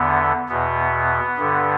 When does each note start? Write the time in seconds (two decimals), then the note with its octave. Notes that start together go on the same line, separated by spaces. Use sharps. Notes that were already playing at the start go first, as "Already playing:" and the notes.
Already playing: E2 D3 B3
0.49 E2 B2 B3
1.38 G2 D3